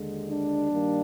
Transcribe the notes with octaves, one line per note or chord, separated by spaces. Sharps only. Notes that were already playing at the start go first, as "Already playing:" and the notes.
Already playing: D#2 D3 G#3
D4
G2 D#3 G3 A#3